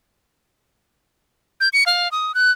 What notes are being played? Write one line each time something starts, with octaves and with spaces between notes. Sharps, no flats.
G6
C#7
F5
D#6
F#6